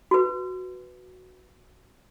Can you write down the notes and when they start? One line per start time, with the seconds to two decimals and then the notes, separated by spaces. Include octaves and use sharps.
0.11 F#4 B4